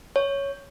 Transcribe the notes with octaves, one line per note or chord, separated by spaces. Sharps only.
C#5